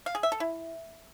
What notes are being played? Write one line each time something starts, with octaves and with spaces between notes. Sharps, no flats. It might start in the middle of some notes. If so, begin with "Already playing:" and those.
F5
G#4
E5
A4
E4